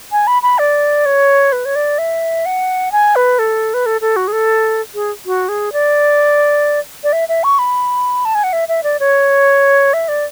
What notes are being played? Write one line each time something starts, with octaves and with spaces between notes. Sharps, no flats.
G#5
B5
B5
D5
C#5
B4
C#5
D5
E5
F#5
G#5
B4
A4
B4
A4
A4
F#4
G#4
A4
G#4
F#4
G#4
D5
D5
E5
E5
C#6
B5
A5
G#5
F#5
E5
E5
D5
C#5
E5
D5